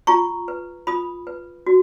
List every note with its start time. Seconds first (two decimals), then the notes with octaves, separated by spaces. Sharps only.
0.07 F4 A#5 C#6
0.48 B4
0.87 F4 B5 D#6
1.27 B4
1.66 F#4